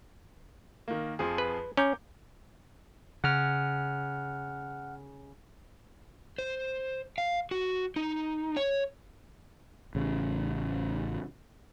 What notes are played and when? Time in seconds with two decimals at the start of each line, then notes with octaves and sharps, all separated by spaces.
0.88 D#3 A#3
1.19 F2 F3 G#4
1.38 B4
1.77 C#4 A#5 D6 G6
3.24 C#3 F#5 F6
6.38 C5
7.18 F5
7.51 F#4
7.96 D#4
8.57 C#5
9.95 A1 C#3